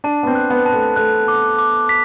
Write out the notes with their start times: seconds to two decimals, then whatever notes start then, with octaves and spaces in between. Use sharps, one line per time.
0.04 D4 A5
0.23 B3
0.27 C4
0.35 F#6
0.50 B3
0.66 A5
0.73 A3
0.96 A3 F#6
1.28 D6
1.58 D6
1.89 B6